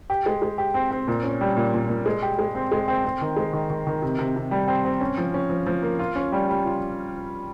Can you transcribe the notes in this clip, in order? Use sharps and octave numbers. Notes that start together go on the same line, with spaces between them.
G4
G#3
G#3
G4
C4
C4
A#2
C#4
G3
A#2
A#2
A#2
G#3
G4
G#3
C4
G#3
C4
C4
D#3
G#3
D#3
D#3
D#3
C3
C3
C3
G3
C4
C4
C#4
F3
C#4
F3
F3
A#3
F4
C#4
G3
G3
F4